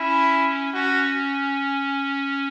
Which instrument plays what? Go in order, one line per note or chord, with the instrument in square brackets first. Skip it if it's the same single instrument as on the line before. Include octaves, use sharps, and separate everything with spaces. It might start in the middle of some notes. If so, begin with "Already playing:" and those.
Already playing: [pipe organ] C#4 [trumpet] E4
[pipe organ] C#4 [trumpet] F#4